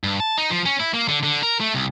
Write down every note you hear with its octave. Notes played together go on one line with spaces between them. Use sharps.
G2
A5
D#4
F3
C#4
E4
A#3
D3
D3
A#4
A3
C2